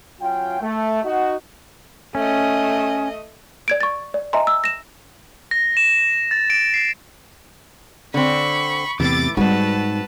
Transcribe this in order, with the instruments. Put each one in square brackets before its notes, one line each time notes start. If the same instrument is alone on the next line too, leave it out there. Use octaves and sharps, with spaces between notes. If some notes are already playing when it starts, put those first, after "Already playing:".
[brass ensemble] F#3 C#4 F4 G5
A3
D#4 F#4
[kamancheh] A3 D#5 [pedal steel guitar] C#4
[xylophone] D5 G#6 D7
C#6 A6
D5
D#5 E5 G#5 A#5 C6
E6
A#6 E7
[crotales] A#6
E7
A6
D7
C7
[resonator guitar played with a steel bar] D3 C4 [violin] B5 C#6
[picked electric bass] E2 C3 [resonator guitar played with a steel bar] A2 E3 [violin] D6 A6
[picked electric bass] G#2 [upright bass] G3 [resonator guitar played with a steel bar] C4 F#4 [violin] B4 A5